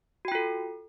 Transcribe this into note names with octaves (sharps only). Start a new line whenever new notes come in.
F4 F#4 A4 G5